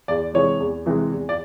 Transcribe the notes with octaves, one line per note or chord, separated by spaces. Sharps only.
E2 D5
C3 E3 G#3 C#5
E2
C3 E3 G#3
E2
D5